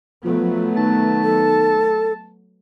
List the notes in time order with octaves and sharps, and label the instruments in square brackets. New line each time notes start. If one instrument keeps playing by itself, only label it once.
[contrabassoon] F3 [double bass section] F#3 A3 B3
[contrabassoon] D#3 [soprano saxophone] A5
[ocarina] A4